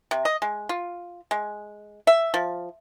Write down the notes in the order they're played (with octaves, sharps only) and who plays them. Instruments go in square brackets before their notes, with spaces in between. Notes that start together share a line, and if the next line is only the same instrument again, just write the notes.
[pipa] C3
D#5
G#3
F4
G#3
E5
F3